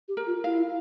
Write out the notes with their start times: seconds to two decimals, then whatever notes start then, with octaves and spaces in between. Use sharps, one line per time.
0.08 G4
0.17 A#4
0.27 F4
0.44 E4 F5